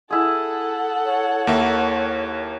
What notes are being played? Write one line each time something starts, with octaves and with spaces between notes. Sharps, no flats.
E4 G#4 A4 F#5
C#5
D#2 A#3 E5